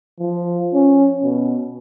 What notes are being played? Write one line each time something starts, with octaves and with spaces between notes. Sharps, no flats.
F3
C#4
B2